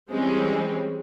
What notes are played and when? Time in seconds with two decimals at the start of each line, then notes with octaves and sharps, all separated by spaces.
0.10 E3 G3 G#3 C4 C#4